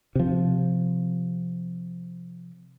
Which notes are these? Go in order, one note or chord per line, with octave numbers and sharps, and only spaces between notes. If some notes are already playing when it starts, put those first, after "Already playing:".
C3 F3